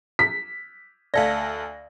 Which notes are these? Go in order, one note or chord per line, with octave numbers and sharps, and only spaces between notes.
B6
D2 A4 D5 E5 F5 A#6